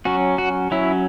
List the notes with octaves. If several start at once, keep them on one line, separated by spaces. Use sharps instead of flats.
F#3 C#4 F#4
F#4
F#3 C#4 E4